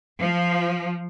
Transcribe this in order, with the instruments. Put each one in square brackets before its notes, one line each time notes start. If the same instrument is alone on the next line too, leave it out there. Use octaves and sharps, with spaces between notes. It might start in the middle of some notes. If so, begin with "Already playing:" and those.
[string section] F3